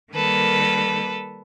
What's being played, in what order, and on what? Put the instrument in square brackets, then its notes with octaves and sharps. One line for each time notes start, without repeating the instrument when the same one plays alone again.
[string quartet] D#3 G3 A#3 A4 B4